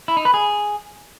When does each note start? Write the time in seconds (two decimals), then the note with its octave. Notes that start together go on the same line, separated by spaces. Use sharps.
0.08 E4
0.17 D#4
0.25 B4
0.34 G#4